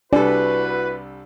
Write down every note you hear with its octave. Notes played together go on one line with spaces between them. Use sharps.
C2 G3 D4 E4 F#4 A4 B4 D5